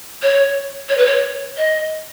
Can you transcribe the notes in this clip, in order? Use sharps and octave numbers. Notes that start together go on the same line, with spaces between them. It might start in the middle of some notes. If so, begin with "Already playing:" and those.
C#5
C#5
B4
C#5
D#5